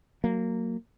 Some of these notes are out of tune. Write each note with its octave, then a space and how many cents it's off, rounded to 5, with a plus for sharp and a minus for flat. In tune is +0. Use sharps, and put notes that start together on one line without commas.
F#3 +0 A#3 -20